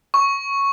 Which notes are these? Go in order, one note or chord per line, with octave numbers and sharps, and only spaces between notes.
C#6